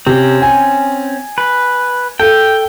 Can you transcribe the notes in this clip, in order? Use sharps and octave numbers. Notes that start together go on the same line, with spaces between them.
C3 C4 C#4
G#5
B4
A4 G5